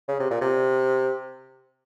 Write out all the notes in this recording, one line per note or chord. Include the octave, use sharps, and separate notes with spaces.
C#3
C3
A#2
C3